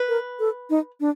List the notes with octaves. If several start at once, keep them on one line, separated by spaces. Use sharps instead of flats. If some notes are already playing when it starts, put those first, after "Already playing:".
Already playing: B4
A#4
A4
D#4
D4